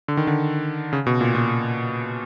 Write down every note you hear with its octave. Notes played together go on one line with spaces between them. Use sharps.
D3
D#3
D3
C#3
B2
A#2
A#2